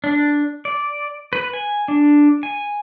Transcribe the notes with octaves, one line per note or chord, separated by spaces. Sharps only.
D4
D5
B4
G#5
D4
G#5